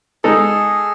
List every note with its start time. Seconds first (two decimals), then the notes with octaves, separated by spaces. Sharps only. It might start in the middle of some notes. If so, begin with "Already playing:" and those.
0.24 G#3 D#4 G#4 A4